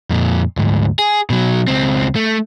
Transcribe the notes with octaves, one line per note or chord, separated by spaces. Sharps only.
F2 A#2
D2 G#2
G#4
B2 F#3
C#2 C4
A3